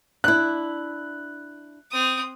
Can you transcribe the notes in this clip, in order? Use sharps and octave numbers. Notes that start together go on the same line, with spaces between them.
D4 E4 F#6
C4 D#6